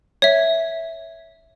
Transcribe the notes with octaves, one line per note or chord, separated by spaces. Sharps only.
C#5 E5